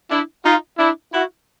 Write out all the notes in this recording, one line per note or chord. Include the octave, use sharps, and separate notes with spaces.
D4 E4
D#4 F4
D4 E4
E4 F#4